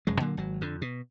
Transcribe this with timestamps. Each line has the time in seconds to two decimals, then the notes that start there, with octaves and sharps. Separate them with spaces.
0.07 F1 F#2 G#3
0.20 A#2 D3 F#3 A#3
0.37 G#1 F#3
0.61 F2 D3
0.82 B2